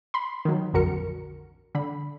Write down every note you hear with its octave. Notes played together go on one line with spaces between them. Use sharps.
B5 C6
D#3 F#3
A#1 F2 D3 F#4 A#4 C#7
D3 B5